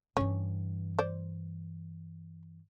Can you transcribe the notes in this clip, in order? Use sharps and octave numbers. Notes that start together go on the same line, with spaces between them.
G2 E3 C#4
C5 D5